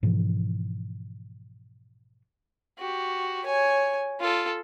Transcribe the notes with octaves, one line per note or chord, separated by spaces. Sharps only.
G#2 B2 E3 F3
F#4 G4
C#5 G#5
F4 A4